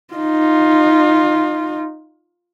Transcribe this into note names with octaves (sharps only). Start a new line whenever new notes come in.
D#4 F4